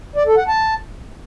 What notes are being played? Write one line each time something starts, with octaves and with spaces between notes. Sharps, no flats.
D5
A4
F#5
A5